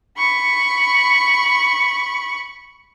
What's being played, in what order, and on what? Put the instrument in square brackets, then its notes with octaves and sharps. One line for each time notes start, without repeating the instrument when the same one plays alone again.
[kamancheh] B5 C#6